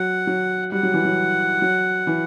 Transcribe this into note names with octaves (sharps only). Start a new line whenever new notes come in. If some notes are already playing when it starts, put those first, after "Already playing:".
Already playing: F#3 F#5
F#3
G3 F#5
F#3
E3
F#3
F#3
E3